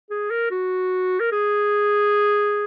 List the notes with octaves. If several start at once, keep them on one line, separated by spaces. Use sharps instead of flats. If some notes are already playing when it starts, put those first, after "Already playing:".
G#4
A#4
F#4
A#4
G#4